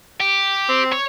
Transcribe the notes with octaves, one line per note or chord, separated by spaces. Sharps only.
G4
C4
C#5